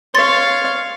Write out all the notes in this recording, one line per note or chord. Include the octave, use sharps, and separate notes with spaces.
C#5 F5 C6 A6